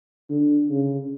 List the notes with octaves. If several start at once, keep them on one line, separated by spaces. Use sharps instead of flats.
D3
C#3